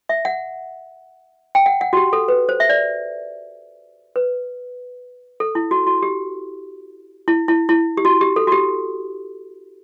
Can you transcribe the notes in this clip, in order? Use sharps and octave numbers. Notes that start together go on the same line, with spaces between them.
E5
F#5
G5
F#5
F#5
F#4
G4
A4
B4
C5
E5
D5
B4
A4
E4
F#4
F#4
G4
E4
E4
E4
G4
F#4
G4
A4
F#4
G4